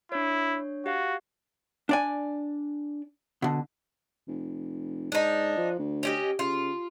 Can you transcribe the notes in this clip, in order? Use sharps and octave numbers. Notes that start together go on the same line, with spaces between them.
D4 E4 C#5
F#4 G4 F5
D4 D5 G#5
B2 D3
F1
G#2 D4 D#4
F3
D2
C#4 G4 D#5
C#3 F4